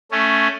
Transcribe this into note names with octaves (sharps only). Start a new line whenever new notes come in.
A3 C#4